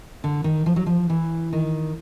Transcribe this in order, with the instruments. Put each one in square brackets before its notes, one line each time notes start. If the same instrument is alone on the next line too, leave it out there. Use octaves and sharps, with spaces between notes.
[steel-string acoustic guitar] D3
D#3
F3
F#3
F3
E3
D#3